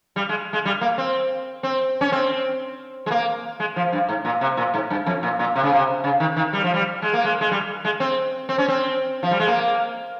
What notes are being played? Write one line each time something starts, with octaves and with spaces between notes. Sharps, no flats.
G3
G#3
G#3
G3
A#3
C4
C4
C#4
C4
G#3
A#3
G#3
F3
G2
G#2
A#2
C3
A#2
G#2
G2
F2
A#2
A#2
C3
C#3
C3
C#3
D#3
D#3
G3
F3
G3
G#3
A#3
G#3
G#3
G3
G#3
C4
C4
C#4
C4
F3
G3
G#3
A#3